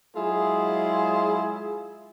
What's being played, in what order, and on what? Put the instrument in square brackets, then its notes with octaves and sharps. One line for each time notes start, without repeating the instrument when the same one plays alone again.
[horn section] F#3 G#3 E4 F4 G#4